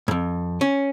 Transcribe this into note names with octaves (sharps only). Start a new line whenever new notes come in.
F2 G#2
C#4